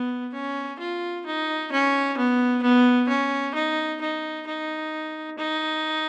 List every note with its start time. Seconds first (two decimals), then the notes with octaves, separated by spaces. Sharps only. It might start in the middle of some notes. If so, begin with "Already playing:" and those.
Already playing: B3
0.33 C#4
0.79 F4
1.26 D#4
1.72 C#4
2.17 B3
2.63 B3
3.09 C#4
3.54 D#4
4.01 D#4
4.47 D#4
5.38 D#4